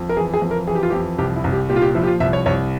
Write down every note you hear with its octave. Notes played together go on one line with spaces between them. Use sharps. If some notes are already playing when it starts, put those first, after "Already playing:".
Already playing: F2
A#4
E3 G#4
G#4
F2
A#4
E3 G#4
G4
F4
F2 G4
C2 G4
E4
C2
G4
A#2 G4
F4
G4
F3 E4
G4
F4
C2 E5
C#5
C2 C#5